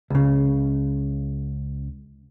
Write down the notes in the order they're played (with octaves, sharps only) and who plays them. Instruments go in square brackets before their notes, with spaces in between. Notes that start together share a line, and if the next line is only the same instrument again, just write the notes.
[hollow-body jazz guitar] C#2 C#3